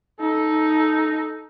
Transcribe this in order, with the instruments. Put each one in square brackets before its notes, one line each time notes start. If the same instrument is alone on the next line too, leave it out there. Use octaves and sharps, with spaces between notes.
[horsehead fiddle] D#4 A4